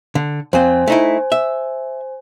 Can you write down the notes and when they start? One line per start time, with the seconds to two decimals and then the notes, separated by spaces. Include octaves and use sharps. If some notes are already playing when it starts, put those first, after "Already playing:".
0.15 D3
0.53 F2 C4 C5 G#5
0.87 A3 D#4 E4
1.32 E5